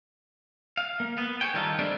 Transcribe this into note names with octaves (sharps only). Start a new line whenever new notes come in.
F5
A#3
B3
G#4 C5 C#5 G5
D#3 G3 A3 D4 D#4 F4
G3 A3 C4 D4 G5